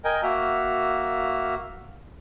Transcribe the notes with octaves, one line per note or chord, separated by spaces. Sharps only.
A#4 D#5 G5 G#5
A#3 F#4 E5 F6